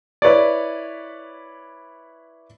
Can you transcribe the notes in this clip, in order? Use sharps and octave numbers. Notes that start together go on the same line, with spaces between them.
E4 B4 C#5 D5